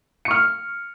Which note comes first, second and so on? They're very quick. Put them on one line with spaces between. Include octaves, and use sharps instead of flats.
C#7 C#6 F6